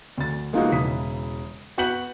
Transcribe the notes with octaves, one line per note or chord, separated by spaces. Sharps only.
D2 A6
G#3 A#3 B3 D#4 F4 F#4
E1 C#3 E4 D#6 B6
B3 F#4 F#5 G6 B6 F#7